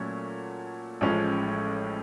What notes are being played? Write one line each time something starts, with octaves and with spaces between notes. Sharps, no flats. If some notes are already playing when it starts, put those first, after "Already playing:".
Already playing: A#2 F#3 A3 C#4
A1 A2 F3 G#3 C#4